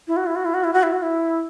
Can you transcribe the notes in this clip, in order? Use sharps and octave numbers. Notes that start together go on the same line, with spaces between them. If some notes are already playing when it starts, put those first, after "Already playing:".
E4
F#4
E4
F#4
E4
F#4
E4
F#4
E4
F#4
E4